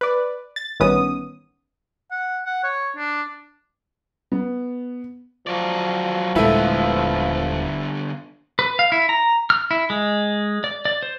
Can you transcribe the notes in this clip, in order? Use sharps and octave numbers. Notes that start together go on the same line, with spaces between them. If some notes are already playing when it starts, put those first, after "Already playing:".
B4 D5
A6
A1 G2 D#3 B3 C#4 D#6
F#5
F#5
C#5
D4
B3
F3 F#3 D5
D#1 D3 G#3 A3 B3 E4
B4
F5
E4
A#5
F6
E4
G#3
D5
D5
C5